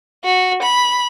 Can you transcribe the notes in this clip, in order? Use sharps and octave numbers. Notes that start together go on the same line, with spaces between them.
F#4
B5